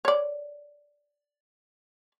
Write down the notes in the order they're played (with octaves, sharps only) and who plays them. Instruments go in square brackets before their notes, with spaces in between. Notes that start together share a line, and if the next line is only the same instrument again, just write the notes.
[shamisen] C#5 D5